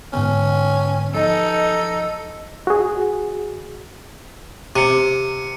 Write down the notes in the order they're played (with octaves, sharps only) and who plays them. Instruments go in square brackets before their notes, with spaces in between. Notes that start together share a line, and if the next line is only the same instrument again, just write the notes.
[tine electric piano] G#2 D3 B3 [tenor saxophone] C#4
[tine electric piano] F3 [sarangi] D#4 [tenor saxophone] A4
[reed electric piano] F#4 G#4
[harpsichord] C3 [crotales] C#7 D#7